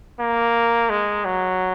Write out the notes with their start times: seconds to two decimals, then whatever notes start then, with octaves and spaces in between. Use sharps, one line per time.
0.19 A#3
0.90 G#3
1.25 F#3